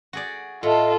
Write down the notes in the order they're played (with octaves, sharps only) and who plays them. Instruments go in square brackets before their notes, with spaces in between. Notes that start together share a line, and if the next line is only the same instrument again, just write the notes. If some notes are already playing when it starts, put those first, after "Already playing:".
[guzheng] F#4 G#4 D5
[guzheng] A2 [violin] F4 A4 [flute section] D#5 E5